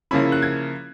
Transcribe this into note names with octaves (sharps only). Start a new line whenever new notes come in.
C#3 F3 A#3 C#4 E4 B5
F#6
G#6